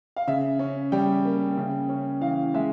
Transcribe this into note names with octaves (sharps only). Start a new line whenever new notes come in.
F5
C#3 E5
C#4
G3 G5
A#3
C#3
C#4
E3 F5
G#3 E5